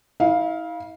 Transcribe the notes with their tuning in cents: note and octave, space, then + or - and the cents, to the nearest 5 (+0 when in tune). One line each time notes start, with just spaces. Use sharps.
E4 -40 F5 +0